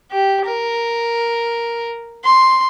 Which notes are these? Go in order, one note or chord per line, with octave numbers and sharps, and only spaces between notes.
G4
A#4
C6